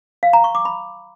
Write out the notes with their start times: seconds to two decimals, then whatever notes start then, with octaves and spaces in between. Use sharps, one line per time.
0.23 F5
0.33 A#5
0.44 C#6
0.55 D6
0.65 B5